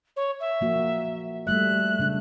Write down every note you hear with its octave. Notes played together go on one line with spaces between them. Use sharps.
C#5
E5
F3 A#3 F#4
G3 A3 E5 F#6
C#3 G#3 D4